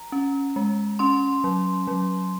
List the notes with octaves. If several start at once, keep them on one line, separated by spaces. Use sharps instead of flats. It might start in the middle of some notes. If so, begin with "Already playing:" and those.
Already playing: A#5
C#4
G#3
C#4 C6
F#3
F#3